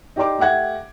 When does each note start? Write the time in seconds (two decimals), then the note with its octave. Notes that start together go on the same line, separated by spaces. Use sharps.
0.16 D#4 G4 D5 C6 D6
0.39 A3 G4 E5 F#5 G#6